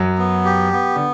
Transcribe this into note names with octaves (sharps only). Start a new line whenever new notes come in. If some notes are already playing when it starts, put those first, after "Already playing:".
Already playing: F#2 F#3
B3
G4
B3
D3